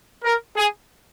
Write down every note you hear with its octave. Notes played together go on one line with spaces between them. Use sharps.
A#4
G#4